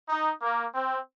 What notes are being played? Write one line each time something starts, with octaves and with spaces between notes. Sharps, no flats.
D#4
A#3
C4